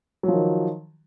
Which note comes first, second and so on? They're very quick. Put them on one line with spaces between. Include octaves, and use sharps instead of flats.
F#3 F3 D#3